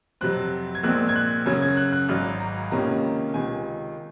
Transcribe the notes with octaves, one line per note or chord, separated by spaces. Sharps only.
F2 C3 F#3 C4 F#6
G#6
A#1 A#2 G#3 C4 F#6
G#6
F#6
F#2 C#3 F#3 C#4 G#6
G#6
F#6
F#6
G#1 G#2 F#3 F6
A#5
C#2 C3 D#3 A#3 C#4 A#5
C#2 C3 D#3 G#5